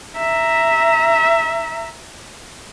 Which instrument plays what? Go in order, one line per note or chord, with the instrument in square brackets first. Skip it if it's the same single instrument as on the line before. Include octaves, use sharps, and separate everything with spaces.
[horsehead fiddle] E5 A#5